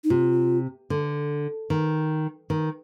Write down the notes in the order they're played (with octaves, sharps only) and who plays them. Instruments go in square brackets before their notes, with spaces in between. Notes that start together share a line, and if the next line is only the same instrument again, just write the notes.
[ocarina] D#4
[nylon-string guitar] C3 [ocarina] F4
[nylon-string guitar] D3
D#3
D#3